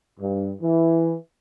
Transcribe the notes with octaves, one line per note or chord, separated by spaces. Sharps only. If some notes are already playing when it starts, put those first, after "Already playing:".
G2
E3